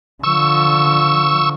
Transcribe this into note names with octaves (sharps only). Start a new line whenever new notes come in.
D3 F3 C#6 E6